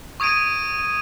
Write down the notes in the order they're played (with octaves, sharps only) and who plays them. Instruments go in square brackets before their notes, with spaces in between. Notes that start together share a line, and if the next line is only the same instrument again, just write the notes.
[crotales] C#6 D#6 G#6 D7 D#7